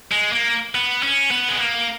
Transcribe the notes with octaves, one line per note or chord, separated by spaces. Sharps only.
G#3
A#3
B3
C#4
B3
G#3
A#3